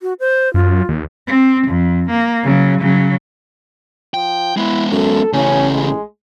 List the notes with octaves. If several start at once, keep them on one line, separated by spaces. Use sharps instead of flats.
F#4
C5
F#2 F4
D#2
C4
F2
A#3
C#3 F#3
C#3 F#3
F3 G5
G#3 B3 E4
F#2 A4
A1 A2 C#3 C#4
G#3